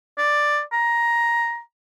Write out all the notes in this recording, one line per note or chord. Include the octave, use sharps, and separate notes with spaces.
D5
A#5